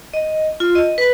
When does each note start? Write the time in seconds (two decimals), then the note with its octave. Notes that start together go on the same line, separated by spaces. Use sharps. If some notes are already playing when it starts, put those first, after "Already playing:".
0.14 D#5
0.60 F4
0.75 D#5
0.98 B4